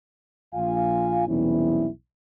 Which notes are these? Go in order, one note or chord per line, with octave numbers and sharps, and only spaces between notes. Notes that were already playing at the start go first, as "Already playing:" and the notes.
A#1 F4 F5 G#5
B1 E2 C3 G3 C#4 E4